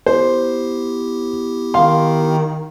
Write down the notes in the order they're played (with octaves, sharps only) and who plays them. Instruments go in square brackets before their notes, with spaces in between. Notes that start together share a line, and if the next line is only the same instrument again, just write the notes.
[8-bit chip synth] B3 E4 G4 [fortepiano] C5
[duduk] D#3 [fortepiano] F5 C6